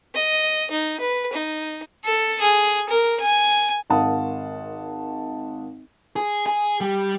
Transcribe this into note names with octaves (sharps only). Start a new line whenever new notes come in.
D#5
D#4
B4
D#4
A4
G#4
A#4
G#5
G#1 A#4 F5 F#5 A5 D#6
G#4
G#4
G3